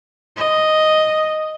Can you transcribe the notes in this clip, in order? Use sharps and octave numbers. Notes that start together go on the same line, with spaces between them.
D#5